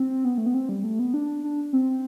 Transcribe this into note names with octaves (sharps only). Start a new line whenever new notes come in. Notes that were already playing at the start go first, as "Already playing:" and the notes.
Already playing: C4
B3
A3
B3
C4
G3
A3
B3
D4
D4
C4